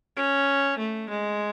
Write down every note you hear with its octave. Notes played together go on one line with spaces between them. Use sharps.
C#4
A3
G#3